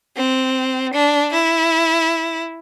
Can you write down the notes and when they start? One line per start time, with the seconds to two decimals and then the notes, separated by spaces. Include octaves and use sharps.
0.17 C4
0.94 D4
1.34 E4